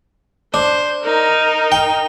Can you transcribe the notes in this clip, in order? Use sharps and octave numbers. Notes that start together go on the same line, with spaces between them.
D4 C5
D#4 A#4
G5